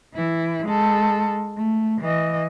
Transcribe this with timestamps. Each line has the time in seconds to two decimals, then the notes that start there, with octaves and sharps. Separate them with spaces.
0.14 E3 E4
0.66 G#3 A4
1.56 A3
2.01 E3 D#5